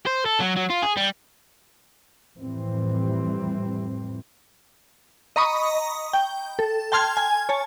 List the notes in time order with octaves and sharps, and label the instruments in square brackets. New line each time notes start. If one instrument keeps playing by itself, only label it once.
[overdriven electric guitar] C5
A4
F#3
F#3
F4
G#4
G3
[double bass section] F2 A2 E3 G3 C4
[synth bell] D#5 A#5 B5 C#6 D#6
G5
A4
G5 A5 C6 F6 G#6
G#5
C#5 G#5 A5